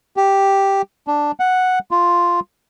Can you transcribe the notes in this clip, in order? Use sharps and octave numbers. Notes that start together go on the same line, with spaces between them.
G4
D4
F#5
F4